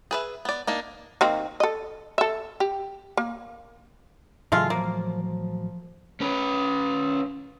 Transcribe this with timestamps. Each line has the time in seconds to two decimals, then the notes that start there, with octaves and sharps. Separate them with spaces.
0.11 G#4 B4 E5
0.45 B3 D5
0.67 A#3 D4 D#4
1.21 D#3 A#3 C4
1.60 A4 D#5
2.18 A4 E5
2.60 G4
3.17 A#3
4.52 A2 C#3 E3 F#3 G#3 A3 F4
4.70 F3 A#3
5.23 F3
6.21 C#4 B4